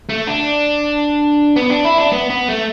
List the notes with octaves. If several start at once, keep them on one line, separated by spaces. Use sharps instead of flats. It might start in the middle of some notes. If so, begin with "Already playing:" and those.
A3
D4
B3
D4
E4
D4
B3
B3
A3